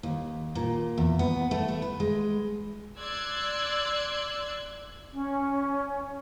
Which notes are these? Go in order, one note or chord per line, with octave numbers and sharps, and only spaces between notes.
D#2
A#2
E2
B3
A3
A3
B4
G#3
D5 C6 E6 F#6 G#6
C#4